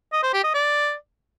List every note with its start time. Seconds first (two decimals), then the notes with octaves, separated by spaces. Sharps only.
0.13 D#5
0.23 C5
0.34 G4
0.44 D#5
0.55 D5